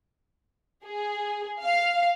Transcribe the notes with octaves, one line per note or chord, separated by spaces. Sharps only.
G#4
F5